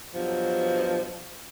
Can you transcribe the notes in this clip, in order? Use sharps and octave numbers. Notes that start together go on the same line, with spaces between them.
G2 B2 F3 F#3